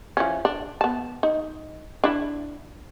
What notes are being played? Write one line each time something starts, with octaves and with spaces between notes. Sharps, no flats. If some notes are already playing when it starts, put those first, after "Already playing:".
E3 F3 C#4
D4
B3 A5
D#4
D4 E4